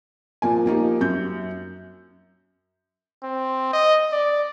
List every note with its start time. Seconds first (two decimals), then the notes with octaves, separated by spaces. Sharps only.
0.42 A#2 F3 A#3 G#5
0.66 F3 A#3 D#4 G4
1.01 F#2 G6
3.23 C4
3.73 D#5
4.12 D5